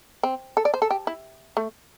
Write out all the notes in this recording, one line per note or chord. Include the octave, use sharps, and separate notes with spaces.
C4
A4
D5
C5
A4
G4
E4
A3